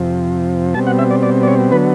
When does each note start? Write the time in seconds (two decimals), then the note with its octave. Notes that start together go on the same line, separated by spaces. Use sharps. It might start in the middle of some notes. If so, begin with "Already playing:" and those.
Already playing: F2 C3 F3
0.74 B2 G3 C4 A5
0.87 F#5
0.99 E5
1.11 D5
1.23 D5
1.43 D5
1.47 C#5
1.71 D3 F#3 B3 B4